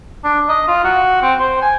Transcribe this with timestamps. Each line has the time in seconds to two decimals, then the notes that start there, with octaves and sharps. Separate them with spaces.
0.24 D4
0.49 D#5
0.68 F4
0.84 F#4
1.22 C4
1.39 C5
1.62 G#5